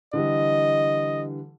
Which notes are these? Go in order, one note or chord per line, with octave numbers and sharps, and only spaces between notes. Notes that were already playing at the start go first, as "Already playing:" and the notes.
D3 E3 G3 D#5